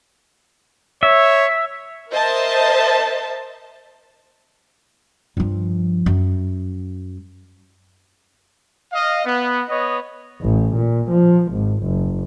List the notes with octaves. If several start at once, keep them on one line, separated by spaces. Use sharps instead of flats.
C#5 E5
A#4 C5 D#5 E5 A5
G2 F3
F#2
D#5 F5
B3
B3 C#5 D#5
A1
A#2
F3
G#1
F#1